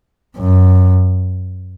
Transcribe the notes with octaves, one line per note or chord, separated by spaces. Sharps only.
F#2